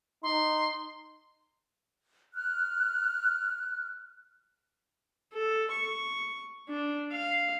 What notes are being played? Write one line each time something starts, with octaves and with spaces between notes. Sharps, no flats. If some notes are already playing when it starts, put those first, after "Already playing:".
D#4 C6
F6 F#6
A4
C#6
D4
F5